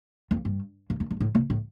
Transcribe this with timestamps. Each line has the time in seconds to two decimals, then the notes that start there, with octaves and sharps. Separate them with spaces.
0.31 F2
0.45 G2
0.90 G2
1.00 F2
1.11 G2
1.20 A2
1.35 C3
1.50 A2